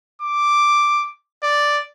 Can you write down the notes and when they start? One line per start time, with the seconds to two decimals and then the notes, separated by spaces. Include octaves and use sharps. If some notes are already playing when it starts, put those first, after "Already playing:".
0.22 D6
1.43 D5